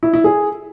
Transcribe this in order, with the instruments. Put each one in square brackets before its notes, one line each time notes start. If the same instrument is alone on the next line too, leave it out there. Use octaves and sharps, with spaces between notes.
[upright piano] E4
E4
G#4